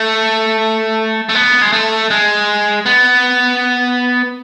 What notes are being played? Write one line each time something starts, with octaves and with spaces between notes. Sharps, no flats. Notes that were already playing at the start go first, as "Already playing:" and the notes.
Already playing: A3
A3
B3
G#3
A3
G#3
B3